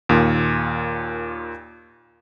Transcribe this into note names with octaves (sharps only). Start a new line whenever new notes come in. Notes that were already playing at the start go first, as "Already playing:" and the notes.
D#2 A#2